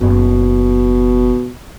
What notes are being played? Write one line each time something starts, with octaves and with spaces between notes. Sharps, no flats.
F#1 B2 D#3